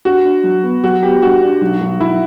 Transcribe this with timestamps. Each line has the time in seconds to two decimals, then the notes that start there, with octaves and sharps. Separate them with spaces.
0.05 D4 F#4
0.25 D4
0.43 F#3
0.63 B3
0.83 F#3 F#4
1.03 B3 G4
1.22 G2 F#4
1.42 D4
1.61 B1
1.81 B1
2.00 B1 E4